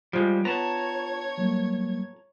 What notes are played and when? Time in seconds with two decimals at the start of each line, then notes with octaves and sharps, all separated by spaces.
0.13 F3 G3 G#3 F4
0.45 B3 C#5 A5 A#5 G#6
1.38 F#3 G3 A#3